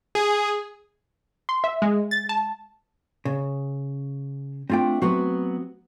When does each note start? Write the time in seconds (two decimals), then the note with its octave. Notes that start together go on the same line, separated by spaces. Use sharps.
0.15 G#4
1.49 C6
1.64 E5
1.82 G#3
2.11 A6
2.29 A5
3.25 C#3
4.70 A3 C4 D4 F4 G5
5.02 F#3 B3 C4 F#4